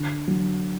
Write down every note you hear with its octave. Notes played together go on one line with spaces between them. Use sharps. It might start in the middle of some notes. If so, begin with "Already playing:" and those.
Already playing: D3
F#3